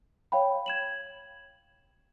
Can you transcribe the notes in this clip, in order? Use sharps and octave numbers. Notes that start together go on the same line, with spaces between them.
C#5 F5 G5 B5
G#6 E7 F#7